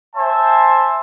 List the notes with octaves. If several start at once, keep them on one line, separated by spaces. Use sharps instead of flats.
C5 E5 G#5 A5 C6